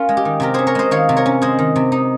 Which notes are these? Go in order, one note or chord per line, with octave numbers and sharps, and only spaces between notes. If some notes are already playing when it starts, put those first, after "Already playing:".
Already playing: C#4 F4 A#4
G#3
G4
D#3
C3 G4 A#4
C#4 G#4 C5
A#4 C#5
G#3 C5 D#5
D#3 C#5 F5
C3
A#4 C#5
C#4
G#3 G#4 C5
D#3
C3
D#4